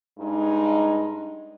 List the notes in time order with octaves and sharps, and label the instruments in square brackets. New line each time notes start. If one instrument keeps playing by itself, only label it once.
[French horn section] G2 G#3 D#4